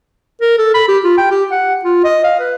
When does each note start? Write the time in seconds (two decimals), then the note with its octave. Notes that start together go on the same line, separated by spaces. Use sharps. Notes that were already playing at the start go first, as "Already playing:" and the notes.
0.41 A#4
0.58 A4
0.74 B5
0.88 G4
1.04 F4
1.18 G5
1.31 G4
1.51 F#5
1.85 F4
2.04 D#5
2.24 F5
2.39 B4